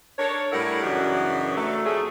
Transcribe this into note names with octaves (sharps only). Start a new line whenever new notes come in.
D4 A4 A#4 C#5
A2 G3 D4 E4 A#4 F#5
F#2 C#3 E3 D4 F#4 D#5
F#3 A3
F2 A3 G#4